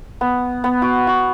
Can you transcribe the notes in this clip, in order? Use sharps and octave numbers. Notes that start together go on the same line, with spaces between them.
B3
B3
F#4
F#4